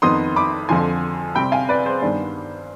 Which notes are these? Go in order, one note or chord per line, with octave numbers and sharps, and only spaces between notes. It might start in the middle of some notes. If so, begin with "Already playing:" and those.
F2 D#3 B3 D#4 C6 D#6
B5 D6
F2 D3 F3 G#5 C6
C3 G3 C4 G5 B5
F5 G#5
B4 D5
G#4 C5
G2 D#3 G3 B3 D4